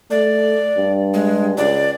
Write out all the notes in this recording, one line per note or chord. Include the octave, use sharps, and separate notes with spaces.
A3 D5
G2
G#3
C#2 D5